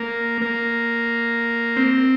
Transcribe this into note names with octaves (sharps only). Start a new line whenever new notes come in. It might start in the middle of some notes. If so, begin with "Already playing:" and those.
Already playing: A#3
A#3
C4